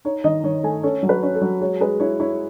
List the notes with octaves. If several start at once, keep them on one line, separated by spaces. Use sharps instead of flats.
D#4 C#5
D#3 D#5
D#3 C#5
A3 G#5
C#4 A4
F#3
B4
C#4
A4
F#3
G#3 C#5
G#3 B4
E4 C#5
E4 C#5